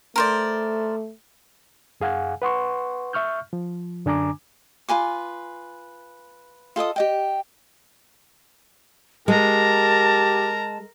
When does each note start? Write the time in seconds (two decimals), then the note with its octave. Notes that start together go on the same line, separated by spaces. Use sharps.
0.16 A3 A#4 C5 D5
2.00 F#2 G#4 F5 F#5 G#5
2.42 B4 F#5 C6 C#6
3.13 E5 C#6 F6 G6
3.53 F3
4.05 F#2 D3 D4 G#5 A#5 D6
4.89 F4 B4 G#5 D6
6.76 F4 A4 D#5 D#6
6.96 G4 D#5 G5
9.28 G#3 G4 A#4 A5 A#5